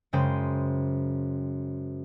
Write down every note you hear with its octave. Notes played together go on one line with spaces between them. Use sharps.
F#2 C#3 G#3 C5 G5 D#6